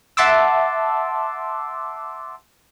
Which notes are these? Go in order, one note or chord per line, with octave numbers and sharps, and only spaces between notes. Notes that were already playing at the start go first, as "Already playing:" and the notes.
E5 F#5 A5 C6 D6 E6